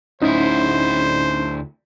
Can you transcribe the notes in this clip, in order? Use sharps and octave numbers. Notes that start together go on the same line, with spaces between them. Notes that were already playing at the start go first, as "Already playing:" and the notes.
D2 C#4 D#4 E4 C5